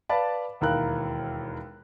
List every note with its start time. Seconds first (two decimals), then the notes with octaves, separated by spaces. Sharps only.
0.09 B4 D5 F5 A5 B5
0.61 E1 D#2 E4 A#4 F5 F#6